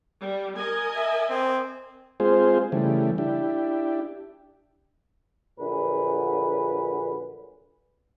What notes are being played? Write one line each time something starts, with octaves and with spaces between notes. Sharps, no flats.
G3
A#4 D#5 G#5
E5
C4
G#3 C4 F4 G#4 C5
C#3 E3 G3 A3
D4 E4 G4
A#1 A#2 D3 F#3 G#4 B4